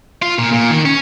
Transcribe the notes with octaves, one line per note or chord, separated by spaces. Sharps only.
F4
A#2
A#2
D#3
C#4